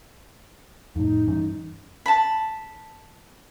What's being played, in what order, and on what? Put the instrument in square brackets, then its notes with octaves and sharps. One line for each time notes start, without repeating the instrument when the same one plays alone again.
[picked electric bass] F2 A2 [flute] D#4
[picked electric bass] G2 E3 C#4
[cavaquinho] A5 B5